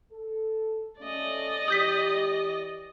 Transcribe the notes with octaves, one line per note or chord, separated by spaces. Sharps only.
A4
A3 C#4 D5 D#5
E3 G4 D#6 G6 B6